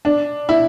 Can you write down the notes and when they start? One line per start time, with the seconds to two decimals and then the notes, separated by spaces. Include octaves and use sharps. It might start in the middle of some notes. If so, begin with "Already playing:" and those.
0.05 D4
0.49 E4